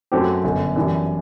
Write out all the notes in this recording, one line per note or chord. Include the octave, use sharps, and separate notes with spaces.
F#2 F#3 A3 C4 G4
G1 F#2 D3
F#2 E3 G3 D4